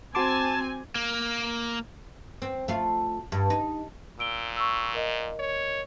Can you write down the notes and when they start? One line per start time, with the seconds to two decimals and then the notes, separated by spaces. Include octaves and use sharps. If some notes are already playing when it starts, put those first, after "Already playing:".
0.15 C4 F#4 G#5 A5 C6 D6
0.95 A#3
2.42 C4
2.68 A3 F4
3.32 G2
3.50 D#4
4.19 A#2 E6 D7 G7
4.57 C#6 E6
4.95 A#4 D#5
5.39 C#5